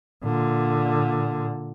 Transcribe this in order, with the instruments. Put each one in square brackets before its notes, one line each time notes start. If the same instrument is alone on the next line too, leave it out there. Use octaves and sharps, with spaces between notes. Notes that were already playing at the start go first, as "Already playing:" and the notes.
[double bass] A#2 D3